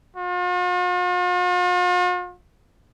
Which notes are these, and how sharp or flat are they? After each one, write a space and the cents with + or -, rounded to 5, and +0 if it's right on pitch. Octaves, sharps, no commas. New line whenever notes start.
F4 +45